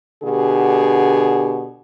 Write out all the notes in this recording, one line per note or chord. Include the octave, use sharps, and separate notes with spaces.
B2 D3 G4 G#4